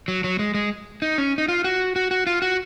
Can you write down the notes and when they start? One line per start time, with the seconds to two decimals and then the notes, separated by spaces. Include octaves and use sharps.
0.08 F#3
0.24 F#3
0.39 G#3
0.54 G#3
1.02 D#4
1.18 C#4
1.38 D#4
1.48 F4
1.64 F#4
1.96 F#4
2.11 F#4
2.27 F4
2.42 F#4